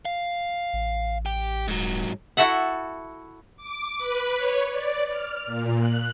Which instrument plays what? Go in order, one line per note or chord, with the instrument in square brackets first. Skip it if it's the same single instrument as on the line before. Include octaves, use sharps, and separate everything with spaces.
[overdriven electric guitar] F5
[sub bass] A1
[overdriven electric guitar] G4
[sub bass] D#1 [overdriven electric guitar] G#2 F#3
[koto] E4 F#4 A4 E5 F#5
[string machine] D6
B4
C#5
D5
F6
A#2
F#6